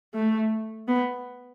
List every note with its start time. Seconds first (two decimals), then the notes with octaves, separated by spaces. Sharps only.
0.14 A3
0.88 B3